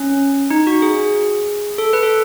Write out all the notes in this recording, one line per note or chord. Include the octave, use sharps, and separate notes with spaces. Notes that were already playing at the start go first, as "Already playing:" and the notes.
Already playing: C#4
D#4
F#4
G#4
A4
B4
A4